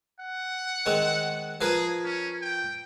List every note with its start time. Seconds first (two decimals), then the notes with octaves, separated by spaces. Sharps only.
0.20 F#5
0.86 D#3 G#3 C4
1.61 F3 G#4 A#4 B4
2.04 C#4
2.42 G5